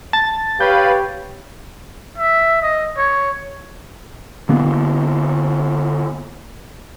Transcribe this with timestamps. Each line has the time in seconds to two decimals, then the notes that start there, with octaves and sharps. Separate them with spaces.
0.13 A5 A6
0.61 G4 B4 C#5 F5 B5 G6
2.18 E5
2.62 D#5
2.97 C#5
4.49 D3 A#3 B3